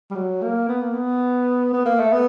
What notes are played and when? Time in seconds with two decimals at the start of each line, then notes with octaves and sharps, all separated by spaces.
0.10 G3
0.15 F#3
0.42 A#3
0.69 B3
0.81 A#3
0.94 B3
1.73 B3
1.85 A#3
2.00 A3
2.13 B3